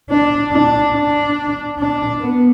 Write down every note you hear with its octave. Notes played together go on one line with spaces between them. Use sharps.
D4
D4
D4
D4
B3